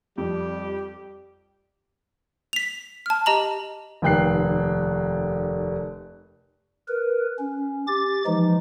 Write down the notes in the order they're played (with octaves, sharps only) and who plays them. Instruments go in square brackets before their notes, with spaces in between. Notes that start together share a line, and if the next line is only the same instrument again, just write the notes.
[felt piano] F2 [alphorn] G3 [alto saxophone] G4
[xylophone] B6 F7
A5 F6
G4 D#5 A#5 F#7
[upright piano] F1 D#2 G5 F#6 C7
[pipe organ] A#4 B4
C#4
G4 D6 A6
E3 F3 G#3 D#4